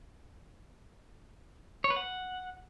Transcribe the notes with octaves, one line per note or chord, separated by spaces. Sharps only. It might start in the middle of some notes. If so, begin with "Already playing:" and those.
C#5
B4
F#5